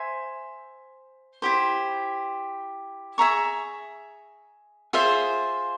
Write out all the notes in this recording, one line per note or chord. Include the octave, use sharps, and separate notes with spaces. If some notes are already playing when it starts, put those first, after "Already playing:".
Already playing: C5 E5 G#5
E4 G4 C5
G#4 E5 A#5 C#6
F4 G#4 C5 E5